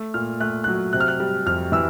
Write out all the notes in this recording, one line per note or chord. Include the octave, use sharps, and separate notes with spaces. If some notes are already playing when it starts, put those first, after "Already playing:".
Already playing: A3
A#2 F6
A3 F#6
F#3 F#6
C3 F#6
F6
F#6
G3
F2 F6
E3 E6